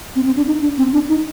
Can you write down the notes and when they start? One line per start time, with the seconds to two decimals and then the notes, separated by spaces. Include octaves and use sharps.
0.16 C4
0.26 C4
0.36 D4
0.47 D#4
0.62 D4
0.78 C4
0.93 D4
1.09 D#4